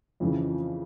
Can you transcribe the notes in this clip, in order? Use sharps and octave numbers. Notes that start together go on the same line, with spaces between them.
F2 C#3 E3